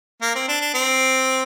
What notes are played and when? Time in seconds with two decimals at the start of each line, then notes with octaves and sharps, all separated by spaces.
0.22 A#3
0.35 C4
0.48 D4
0.61 D4
0.74 C4